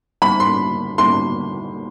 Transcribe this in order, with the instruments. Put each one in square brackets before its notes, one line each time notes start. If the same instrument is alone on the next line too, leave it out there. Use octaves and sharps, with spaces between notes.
[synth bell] G3 B3 D#4 [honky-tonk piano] B5
[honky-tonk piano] C6
[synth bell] G3 B3 D#4 [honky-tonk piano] C6